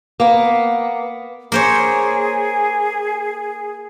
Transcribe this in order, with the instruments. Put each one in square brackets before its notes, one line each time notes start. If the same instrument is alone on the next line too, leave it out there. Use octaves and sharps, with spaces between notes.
[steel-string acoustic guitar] A#3 B3
[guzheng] A#3 C5 C#5 [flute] G#4